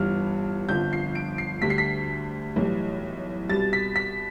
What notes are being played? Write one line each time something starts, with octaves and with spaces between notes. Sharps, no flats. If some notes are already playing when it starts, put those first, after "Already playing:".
Already playing: G1 G2 E3 G3 F6
G1 F2 D3 F3 G6
C7
D7
C7
D2 D3 G3 B6
C7
B6
B1 A2 E3 G3
C2 B2 G3 A6
B6
B6